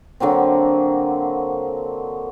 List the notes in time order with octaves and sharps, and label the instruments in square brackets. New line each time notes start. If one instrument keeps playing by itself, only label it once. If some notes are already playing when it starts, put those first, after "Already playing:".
[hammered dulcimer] D3 F#3 A#3 C4